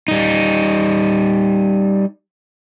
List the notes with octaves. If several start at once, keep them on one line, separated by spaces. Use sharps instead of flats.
G3 D#4